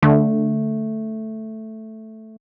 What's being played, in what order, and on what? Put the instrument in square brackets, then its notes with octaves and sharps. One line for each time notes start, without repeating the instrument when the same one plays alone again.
[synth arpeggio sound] D3 [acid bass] A3